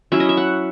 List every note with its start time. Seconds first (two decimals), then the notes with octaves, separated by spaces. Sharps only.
0.12 F#3 C#4 E4 E5
0.20 D#5
0.29 E5
0.37 F#5